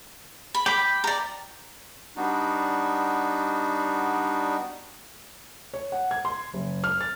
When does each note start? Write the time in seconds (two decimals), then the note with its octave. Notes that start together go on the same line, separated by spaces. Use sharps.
0.55 B5
0.66 G5 B5 D6
1.04 D5 A#5
2.17 G3 B3 D4 D#4 F#4
5.73 C#5
5.92 F#5
6.11 G#6
6.25 C6
6.53 F#1
6.84 F6
7.01 A6